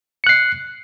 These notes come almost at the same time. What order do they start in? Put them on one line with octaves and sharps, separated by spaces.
C#7 F#6 C7